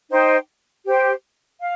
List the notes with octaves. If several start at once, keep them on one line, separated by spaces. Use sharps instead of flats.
D#4 C5 G5
G4 C5 G5
F5